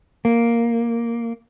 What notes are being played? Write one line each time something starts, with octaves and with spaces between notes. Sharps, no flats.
A#3